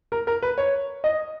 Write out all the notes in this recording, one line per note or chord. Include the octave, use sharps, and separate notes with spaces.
A#4
A#4
B4
C#5
D#5